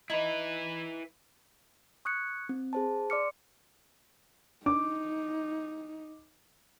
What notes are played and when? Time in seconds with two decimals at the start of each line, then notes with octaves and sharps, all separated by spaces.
0.10 D#4 E4 B4
2.05 C#6 D#6 F#6 G#6 C#7
2.49 C4
2.73 G#4 C5 A5
3.10 D5 C6 D6 F6 C#7
4.66 D4 D#4 D6